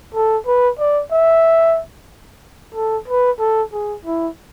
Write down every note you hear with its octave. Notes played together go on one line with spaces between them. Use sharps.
A4
B4
D5
E5
A4
B4
A4
G#4
E4